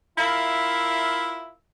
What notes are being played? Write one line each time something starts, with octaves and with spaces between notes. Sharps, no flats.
E4 F4 A#4 E5 F5